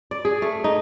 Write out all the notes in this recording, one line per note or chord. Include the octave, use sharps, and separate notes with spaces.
D5
G#4
A3
D#4